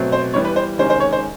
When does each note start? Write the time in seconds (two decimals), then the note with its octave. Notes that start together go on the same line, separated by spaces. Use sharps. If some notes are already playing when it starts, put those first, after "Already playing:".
Already playing: B2 F#3 A3 C4
0.12 C5
0.34 E3 G3 B3 C#5
0.45 B4
0.56 C5
0.78 C3 D#3 G#3 C#4 C5
0.90 C5
1.00 C#5
1.13 C5